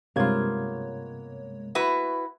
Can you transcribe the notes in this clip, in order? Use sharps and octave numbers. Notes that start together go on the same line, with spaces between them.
G2 C3 G#3 A#3 B3 F4 C#5 G#6
E4 F#4 B4